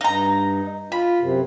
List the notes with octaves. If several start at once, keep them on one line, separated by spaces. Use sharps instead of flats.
G2 D#4 A#5
F4 B5
F#2 C3